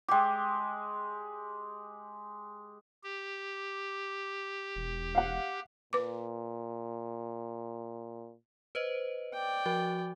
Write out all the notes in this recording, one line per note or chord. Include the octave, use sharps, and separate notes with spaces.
G#3 G4 G5 D6
G4
E1
F5 F#5
A#2 B4 D6
B4 C5 D#5
D5 G5
F3 F#4